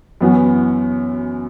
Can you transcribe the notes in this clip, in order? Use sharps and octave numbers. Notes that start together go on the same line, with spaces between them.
F#2 E3 B3 F#4